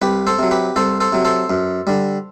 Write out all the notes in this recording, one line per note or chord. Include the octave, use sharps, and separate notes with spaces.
C2 G4 B4
A4 C5
C3 F#3
G4 B4
C2 A4 C5
A4 C5
C3 F#3
A4 C5
F#2
D3 G3